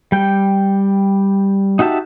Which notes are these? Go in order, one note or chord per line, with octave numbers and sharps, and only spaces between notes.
G3 G5
D#4 F#4 G4 E5 A5